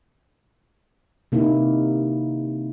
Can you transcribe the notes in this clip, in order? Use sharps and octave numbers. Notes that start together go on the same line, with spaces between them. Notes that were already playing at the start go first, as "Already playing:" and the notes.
C3 A#3 D#4 E4